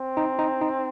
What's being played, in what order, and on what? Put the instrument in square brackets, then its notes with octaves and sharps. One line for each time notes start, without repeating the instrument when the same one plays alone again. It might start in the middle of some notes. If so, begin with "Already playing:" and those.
Already playing: [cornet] C4
[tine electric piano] D#4
D#4
D#4